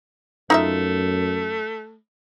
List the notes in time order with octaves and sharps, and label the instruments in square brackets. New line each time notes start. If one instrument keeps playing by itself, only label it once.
[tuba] F#2 [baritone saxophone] A3 [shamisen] D#4 F4 E5